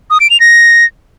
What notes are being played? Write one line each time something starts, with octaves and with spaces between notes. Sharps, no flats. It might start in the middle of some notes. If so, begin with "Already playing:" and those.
D#6
D7
F7
A#6